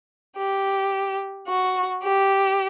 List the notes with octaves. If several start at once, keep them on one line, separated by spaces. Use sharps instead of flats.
G4
F#4
G4